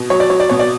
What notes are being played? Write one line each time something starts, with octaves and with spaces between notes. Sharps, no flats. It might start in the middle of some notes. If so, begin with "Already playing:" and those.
Already playing: B2
F#3 C#5
D5
F#3 C#5
D5
B2 C#5
D5